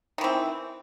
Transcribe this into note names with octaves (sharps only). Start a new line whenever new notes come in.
D#3 E3 C4